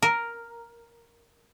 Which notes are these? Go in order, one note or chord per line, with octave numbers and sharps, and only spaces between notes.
A#4